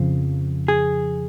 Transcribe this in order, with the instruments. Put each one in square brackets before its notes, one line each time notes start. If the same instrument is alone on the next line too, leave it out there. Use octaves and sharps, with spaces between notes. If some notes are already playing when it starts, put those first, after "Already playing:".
Already playing: [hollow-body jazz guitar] F2 C#3 F3
G#4